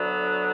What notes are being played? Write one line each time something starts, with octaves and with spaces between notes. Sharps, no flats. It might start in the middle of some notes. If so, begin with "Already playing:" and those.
Already playing: D2 D3 F#3 B3